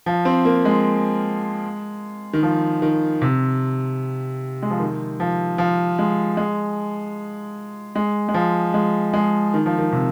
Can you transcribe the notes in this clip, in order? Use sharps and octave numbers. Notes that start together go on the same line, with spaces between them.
F3
C4
A#3
G#3
D#3
F3
D#3
C3
G#3
F3
D#3
F3
F3
G#3
G#3
G#3
G#3
F3
G#3
G#3
D#3
F3
D#3
C3